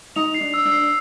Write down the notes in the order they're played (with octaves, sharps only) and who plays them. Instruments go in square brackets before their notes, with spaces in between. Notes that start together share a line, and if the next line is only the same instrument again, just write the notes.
[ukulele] D#4 [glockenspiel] F7
[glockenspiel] C7
[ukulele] D4
[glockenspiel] E6
[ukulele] D4
[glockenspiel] C7